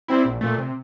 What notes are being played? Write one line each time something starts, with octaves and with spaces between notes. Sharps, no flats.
G3 C4 E4
A#1
A#2 A3
C3